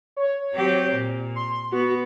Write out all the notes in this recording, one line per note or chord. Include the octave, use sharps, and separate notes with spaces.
C#5
F#3 C4 G4
A#2
C6
B3 F#4